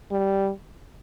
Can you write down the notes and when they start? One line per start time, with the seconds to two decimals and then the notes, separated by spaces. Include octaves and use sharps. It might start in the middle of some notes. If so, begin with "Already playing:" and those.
0.11 G3